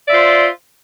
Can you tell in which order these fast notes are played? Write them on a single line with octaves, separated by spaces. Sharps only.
D5 E5 F4 C5